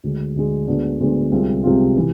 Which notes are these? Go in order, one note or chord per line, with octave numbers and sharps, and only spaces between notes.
D2 D3 G#3
D2 D3 G#3
D2 D3 G#3 B3 D4
D2 D3 G#3 B3 D4
C2 C3 G#3 C4 F4
C2 C3 G#3 C4 F4
C3 E3